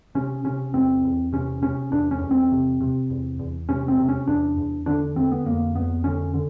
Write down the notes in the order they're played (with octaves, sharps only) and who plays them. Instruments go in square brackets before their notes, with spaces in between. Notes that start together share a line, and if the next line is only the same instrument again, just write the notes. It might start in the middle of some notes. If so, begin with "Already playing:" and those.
[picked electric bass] C3 C#4
C3 C#4
E2 C4
E2
C3 C#4
C3 C#4
E2 D4
C#4
E2
C4
C3
C3
E2
E2
C3 C#4
C4
C3
C#4
E2 D4
E2
D3 D4
D3 C4
B3
F2 A#3
F2 B3
D3 C#4
D3